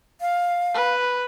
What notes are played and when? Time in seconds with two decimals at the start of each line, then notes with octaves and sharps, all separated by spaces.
0.21 F5
0.74 B4